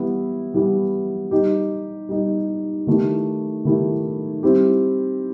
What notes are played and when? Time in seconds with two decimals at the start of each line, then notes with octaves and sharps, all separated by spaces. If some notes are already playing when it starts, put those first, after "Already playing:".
Already playing: E3 G3 B3 E4
0.54 E3 G3 B3 E4
1.31 G3 D#4 G4
2.09 G3 D#4 G4
2.87 D#3 A3 E4 G4
3.65 D#3 A3 E4 G4
4.43 G3 C4 E4 G4